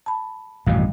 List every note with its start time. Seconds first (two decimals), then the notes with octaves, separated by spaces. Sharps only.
0.06 A5 B5
0.67 A1 F#2 B2 D#3 G3 F5